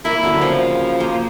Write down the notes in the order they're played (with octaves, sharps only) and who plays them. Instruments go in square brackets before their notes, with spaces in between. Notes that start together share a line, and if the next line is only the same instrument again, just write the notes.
[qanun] A#3 A#4 [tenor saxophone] E4
[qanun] D3 F#3 C#4
[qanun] C#3 [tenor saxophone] F3
[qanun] A#3 G#4 C5